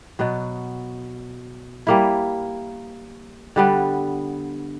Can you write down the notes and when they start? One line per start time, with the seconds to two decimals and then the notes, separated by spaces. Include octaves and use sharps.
0.19 B2 F#3 B3
1.87 G3 A#3 E4
3.56 D3 G3 B3